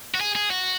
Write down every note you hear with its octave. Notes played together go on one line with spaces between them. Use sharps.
F#4
G#4
G#4
F#4